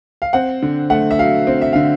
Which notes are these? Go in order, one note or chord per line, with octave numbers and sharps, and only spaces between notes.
F5
C4 F#5
D3
A3 F#5
E5
F#3 F5
C4
E5
D3 F5